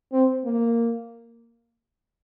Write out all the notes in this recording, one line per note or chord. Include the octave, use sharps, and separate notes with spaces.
C4
A#3